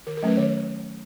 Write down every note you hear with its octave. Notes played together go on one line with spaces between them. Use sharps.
D#3 A#4
A#4
F#3 A3 C#4 B4
D#3 C#5